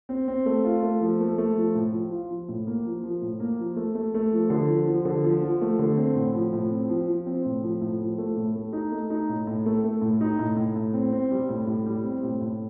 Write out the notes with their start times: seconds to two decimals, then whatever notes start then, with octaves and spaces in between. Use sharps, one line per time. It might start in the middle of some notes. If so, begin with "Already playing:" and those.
0.09 C4
0.28 C4
0.46 A3
0.65 F4
0.83 A3
1.01 F3
1.20 A3
1.38 A3
1.57 F3
1.75 A2
1.93 F3
2.11 F4
2.31 F3
2.49 A2
2.67 A#3
2.85 F3
3.04 F3
3.22 A2
3.40 A#3
3.59 F3
3.76 A3
3.95 A3
4.14 A3
4.33 F3
4.50 D3
4.69 F3
4.88 F3
5.05 D3
5.24 F3
5.42 F3
5.61 A3
5.79 D3
5.98 C4
6.16 A2
6.34 F3
6.53 A2
6.71 C4
6.89 F3
7.08 F3
7.26 C4
7.45 A2
7.63 F3
7.82 A2
8.00 F3
8.18 A3
8.36 A2
8.55 A3
8.73 D#4
8.92 A3
9.10 D#4
9.29 A2
9.47 A2
9.66 A3
9.84 A3
10.02 A2
10.21 D#4
10.39 A2
10.57 A2
10.76 A2
10.94 C4
11.12 C4
11.31 G3
11.49 A2
11.67 A2
11.86 G3
12.04 C4
12.23 A2
12.41 A2